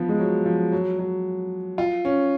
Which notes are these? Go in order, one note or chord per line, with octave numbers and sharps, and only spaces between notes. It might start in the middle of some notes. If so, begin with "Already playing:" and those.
Already playing: F3 B3
G#3
F#3
F3
F#3
F#3
F4
C#4